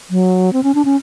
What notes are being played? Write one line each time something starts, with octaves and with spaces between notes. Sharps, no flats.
F#3
C4
C#4
D4
C#4